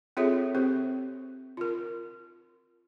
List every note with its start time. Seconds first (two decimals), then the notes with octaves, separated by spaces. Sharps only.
0.17 C4 F4 G#4 A4 C#5 E5
0.55 C4 G4 C5
1.57 F4 A#4